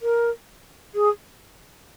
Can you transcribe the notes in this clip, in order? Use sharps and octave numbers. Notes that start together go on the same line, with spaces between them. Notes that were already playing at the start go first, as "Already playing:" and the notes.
A#4
G#4